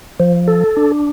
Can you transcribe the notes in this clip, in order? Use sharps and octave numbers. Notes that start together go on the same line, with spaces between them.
F3
A4
D4